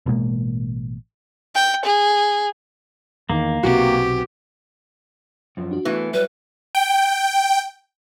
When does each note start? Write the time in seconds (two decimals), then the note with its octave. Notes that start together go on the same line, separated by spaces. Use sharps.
0.06 A1 B2 G#3 A#3
1.55 G5
1.85 G#4
3.30 E2 D#3 A#3
3.63 B1 C3 B3 F#4 G4
5.57 F#2 F3
5.71 D4 F#4
5.85 E3 A3 B3
6.14 F#3 G3 B4
6.75 G5